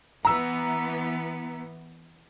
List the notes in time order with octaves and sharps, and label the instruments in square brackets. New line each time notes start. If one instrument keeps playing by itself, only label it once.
[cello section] E3 B3 [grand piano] A#5 E6